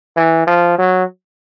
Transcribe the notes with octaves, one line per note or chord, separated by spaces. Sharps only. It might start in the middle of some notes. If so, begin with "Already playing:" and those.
E3
F3
F#3